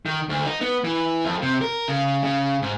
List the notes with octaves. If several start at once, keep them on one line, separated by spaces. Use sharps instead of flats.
D#3
D2
D#4
B3
E3
F2
C3
A#4
C#3
C#3
G#2